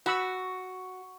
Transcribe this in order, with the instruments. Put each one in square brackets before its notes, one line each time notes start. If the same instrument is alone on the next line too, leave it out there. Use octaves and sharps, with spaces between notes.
[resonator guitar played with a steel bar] F#4 [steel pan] F#5 B5 E6